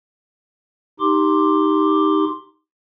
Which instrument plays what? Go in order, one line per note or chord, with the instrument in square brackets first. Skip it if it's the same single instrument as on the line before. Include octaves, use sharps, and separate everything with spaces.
[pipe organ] D#4 G4 C6 D6